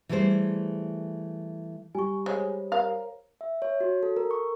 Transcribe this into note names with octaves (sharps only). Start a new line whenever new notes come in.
E3 G3 A3 G#4 C5
G3 G#5 C#6
G#3 C5 C#5
A#4 F5
E5
C#5
F#4
A4
A#4
C#6